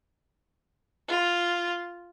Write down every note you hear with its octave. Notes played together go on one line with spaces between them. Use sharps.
F4